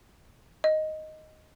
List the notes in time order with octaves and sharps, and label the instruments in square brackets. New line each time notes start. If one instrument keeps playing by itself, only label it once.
[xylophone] D#5